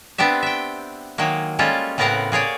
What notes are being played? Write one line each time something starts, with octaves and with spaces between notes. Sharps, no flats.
B3 C4 D4 G4 E5
E5 G5
D#3 F#3 G#3 A#3
G3 G#3 A#3 C#4 F4 A4
A2 C#3 B3 C4 A#4 F#5
A#3 G#4 C#5 D5